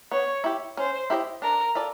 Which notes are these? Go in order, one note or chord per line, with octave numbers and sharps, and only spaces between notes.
B3 C#5
E4 G4
C#4 C5
E4 G4 C5 D#5
D4 A#4
F4 A4 D5